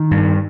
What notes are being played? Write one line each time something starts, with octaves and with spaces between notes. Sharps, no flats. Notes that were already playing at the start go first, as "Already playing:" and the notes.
Already playing: D#3
G2